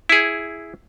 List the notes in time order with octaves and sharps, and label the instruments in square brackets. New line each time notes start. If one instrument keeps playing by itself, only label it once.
[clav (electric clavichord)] E4 G#4